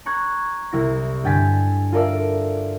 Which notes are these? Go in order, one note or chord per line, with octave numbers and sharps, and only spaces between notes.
A#5 C#6 F#6 G#6
C2 E4 A#6
G2 D3 G5 G#5 A6 B6
F4 A4 A#4 D5 E5